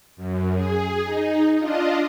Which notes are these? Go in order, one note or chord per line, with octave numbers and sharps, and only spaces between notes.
F#2
G#4
D#4
D4 F4 D#5